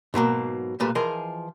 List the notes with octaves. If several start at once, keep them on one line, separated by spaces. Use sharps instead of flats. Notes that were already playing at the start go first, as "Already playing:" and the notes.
G#2 B2 F#3 A#3
B1 A#2 G3 A3 B4
E3 F3 G#4 A#4 D#5